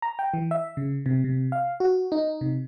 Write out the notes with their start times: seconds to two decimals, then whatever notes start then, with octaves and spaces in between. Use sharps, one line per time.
0.02 A#5
0.19 G5
0.34 E3
0.51 E5
0.77 C#3
1.06 C3
1.24 C3
1.52 F5
1.80 F#4
2.12 D#4
2.41 C3